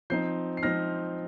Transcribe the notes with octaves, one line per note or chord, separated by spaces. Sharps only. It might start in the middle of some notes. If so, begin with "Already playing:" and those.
F3 C4 D#4 G6 C7
C7
F3 C4 D#4 F6 A#6